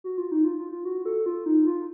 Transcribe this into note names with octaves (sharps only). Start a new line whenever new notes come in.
F#4
F4
D#4
F4
F4
F4
F#4
A4
F4
D#4
F4